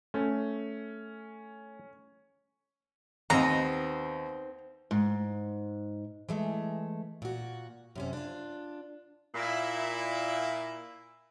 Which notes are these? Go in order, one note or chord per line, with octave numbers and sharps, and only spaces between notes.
A3 C#4
D#2 B3 C4 D#4 A#5
G#2
E3 G#3 A3
A#2 F#4
F#2 C3 C#4
D4 F4
A#2 E4